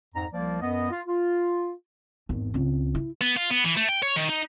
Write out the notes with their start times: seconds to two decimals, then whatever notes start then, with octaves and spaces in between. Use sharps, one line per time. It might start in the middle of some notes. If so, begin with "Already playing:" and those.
0.15 F2 G#2 A#5
0.32 C2 F3 A#3 D5
0.61 F#2 B3 D#5
0.91 F4
1.06 F4
2.29 G#1 E2
2.54 C#2 C4
2.95 E4
3.21 B3
3.37 F4
3.50 B3
3.64 E3
3.77 A3
3.89 G5
4.03 C#5
4.17 D#3
4.29 D#4